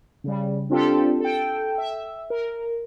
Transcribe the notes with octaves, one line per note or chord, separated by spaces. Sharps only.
C#3 G3
C4 D4 F4 G4 A4
A4 G5
E5
A#4